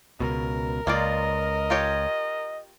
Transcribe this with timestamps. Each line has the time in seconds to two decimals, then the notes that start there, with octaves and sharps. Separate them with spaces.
0.20 C#2 B2 A#4
0.87 C#2 A#3 F4 D5 D#5
1.70 F4 G4 C#5